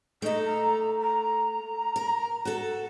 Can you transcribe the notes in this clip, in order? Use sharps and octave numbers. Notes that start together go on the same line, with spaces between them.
A3 D#4 A4
A#5
A#5
A#4
F#4 A4